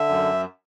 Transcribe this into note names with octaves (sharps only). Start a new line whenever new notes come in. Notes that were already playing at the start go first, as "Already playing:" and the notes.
Already playing: D3 E5
F#2